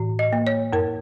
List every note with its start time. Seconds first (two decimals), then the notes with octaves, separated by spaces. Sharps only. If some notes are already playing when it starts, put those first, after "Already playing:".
Already playing: A2 E3
0.19 D#5
0.33 A#3
0.47 C#5
0.73 F#2 A#4